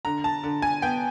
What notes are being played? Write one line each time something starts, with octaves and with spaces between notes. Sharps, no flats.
D3 A#5
A5
D3
G#5
B3 G5